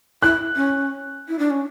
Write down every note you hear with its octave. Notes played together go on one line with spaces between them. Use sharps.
E4 F#6
C#4
E4
D4
C#4